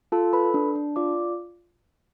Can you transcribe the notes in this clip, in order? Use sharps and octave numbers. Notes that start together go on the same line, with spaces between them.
F4 A4 A5
A4 B4 B5
D4
D4
F4 D5 D6